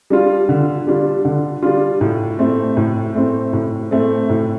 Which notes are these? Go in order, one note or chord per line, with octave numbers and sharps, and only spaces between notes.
G3 D4 F4
D3
G3 D4 F4
D3
G3 D4 F4
A2
A3 C4
A2
A3 C4
A2
A3 C4
A2